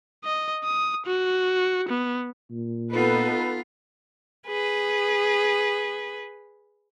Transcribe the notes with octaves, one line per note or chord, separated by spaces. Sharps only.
D#5
D#6
F#4
B3
A#2
B3 D#4 F4 A4 B4
G#4 B4